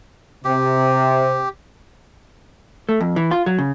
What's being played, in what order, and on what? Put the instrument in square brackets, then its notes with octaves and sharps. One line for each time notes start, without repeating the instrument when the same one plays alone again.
[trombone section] C3 [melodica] G4
[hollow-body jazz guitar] A3
F2
E3
F4
F#3
C#3